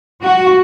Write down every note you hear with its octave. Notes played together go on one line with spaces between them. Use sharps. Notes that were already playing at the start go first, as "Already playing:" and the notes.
F#4